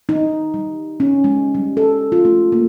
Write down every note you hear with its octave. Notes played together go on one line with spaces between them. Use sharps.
D#4
G3
C#4
G#3
G3
A4
F4
A3
A#3